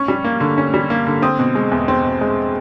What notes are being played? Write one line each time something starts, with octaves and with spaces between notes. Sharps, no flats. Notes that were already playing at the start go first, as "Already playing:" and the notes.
Already playing: C#4 C#6
G3
A#3
D3
C#4
G3
A#3
D3
C4 D#6
B2
G#3
E2
C4
B2
G#3